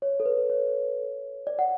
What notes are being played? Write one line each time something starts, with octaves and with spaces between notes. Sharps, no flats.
C#5
A4
B4
C#5
D5
F#5